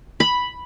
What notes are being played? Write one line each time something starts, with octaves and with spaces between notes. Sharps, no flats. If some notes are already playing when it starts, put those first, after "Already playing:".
B5